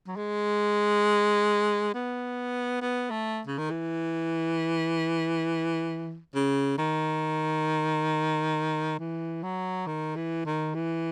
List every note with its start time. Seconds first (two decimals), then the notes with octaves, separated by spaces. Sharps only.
0.07 F#3
0.17 G#3
1.94 B3
2.82 B3
3.10 A3
3.47 C#3
3.58 D#3
3.70 E3
6.35 C#3
6.78 D#3
8.99 E3
9.43 F#3
9.87 D#3
10.16 E3
10.46 D#3
10.75 E3